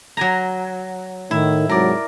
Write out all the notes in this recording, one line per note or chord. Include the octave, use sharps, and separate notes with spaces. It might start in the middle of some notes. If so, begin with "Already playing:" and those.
F#3 G#5 A#5
A2 D#3 E4
G#2 C3 F#3 A#4 D5